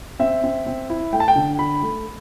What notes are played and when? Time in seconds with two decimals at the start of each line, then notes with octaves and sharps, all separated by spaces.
0.19 C4 E5
0.44 C4
0.67 C4
0.90 E4
1.13 A3 G5
1.20 A5
1.28 G5
1.35 D3
1.59 D3 B5
1.82 A3